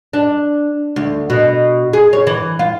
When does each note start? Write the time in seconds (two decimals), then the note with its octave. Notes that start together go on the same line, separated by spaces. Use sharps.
0.13 D4
0.96 D2
1.30 B2
1.93 G#4
2.13 C#5
2.27 E3
2.59 F4